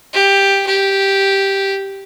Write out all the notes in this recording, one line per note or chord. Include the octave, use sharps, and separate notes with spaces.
G4
G4